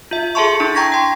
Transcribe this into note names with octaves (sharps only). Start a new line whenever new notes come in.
F4 E5
G#4 A4 E5 A5 C6 C#6
D4 E4 A5
G5 A#5 C#6 G#6 A#6 B6
G5 C6